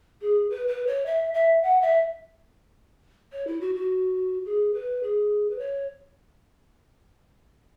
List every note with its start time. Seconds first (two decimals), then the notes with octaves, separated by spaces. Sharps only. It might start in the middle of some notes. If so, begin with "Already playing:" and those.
0.22 G#4
0.50 B4
0.68 B4
0.87 C#5
1.06 E5
1.34 E5
1.63 F#5
1.81 E5
3.32 C#5
3.47 E4
3.61 F#4
3.74 F#4
4.45 G#4
4.74 B4
5.03 G#4
5.50 B4
5.59 C#5